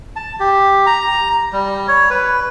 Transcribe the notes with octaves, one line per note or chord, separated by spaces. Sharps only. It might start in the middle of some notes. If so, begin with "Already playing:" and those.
A5
G4
A#5
G3
C#5
B4